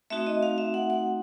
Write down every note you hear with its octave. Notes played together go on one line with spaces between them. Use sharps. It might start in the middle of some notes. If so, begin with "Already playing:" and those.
A3 C4 D#4 F#4 E5
D#5
F5
E5
F#5
F#5